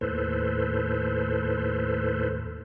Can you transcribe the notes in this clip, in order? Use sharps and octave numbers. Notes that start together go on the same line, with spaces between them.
D#2 A2 A4 B4 C5